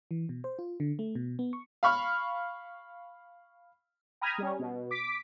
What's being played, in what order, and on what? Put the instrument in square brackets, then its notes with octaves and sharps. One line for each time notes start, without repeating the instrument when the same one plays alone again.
[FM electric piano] E3
B2
C5
F4
D3
A3
B2
B3
C#6
[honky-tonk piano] F5 B5 C#6 F6
[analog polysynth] G5 A#5 B5 D#6 F6 G#6
G3 C#4
B2
D6 B6